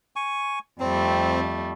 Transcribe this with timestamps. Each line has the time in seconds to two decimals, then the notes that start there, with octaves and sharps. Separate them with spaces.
0.16 G#5 C#6
0.80 F2 G3 A3 C4